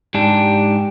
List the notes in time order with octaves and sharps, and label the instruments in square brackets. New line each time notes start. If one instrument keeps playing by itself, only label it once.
[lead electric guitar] G#2 D4 [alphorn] G4